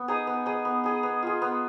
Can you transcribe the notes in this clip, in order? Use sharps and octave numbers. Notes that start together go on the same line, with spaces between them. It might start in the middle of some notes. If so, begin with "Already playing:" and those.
Already playing: B3
D#4 G#4 D#5
B3
D#4 G#4 D#5
B3
D#4 G#4 D#5
B3
F4 G#4
B3